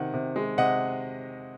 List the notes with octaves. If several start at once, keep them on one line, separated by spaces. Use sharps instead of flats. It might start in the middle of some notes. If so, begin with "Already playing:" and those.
Already playing: C3 D#3 F#5
C3
G#3
C3 D#5 F#5